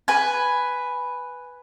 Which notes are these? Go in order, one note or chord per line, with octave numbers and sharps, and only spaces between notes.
B4 G#5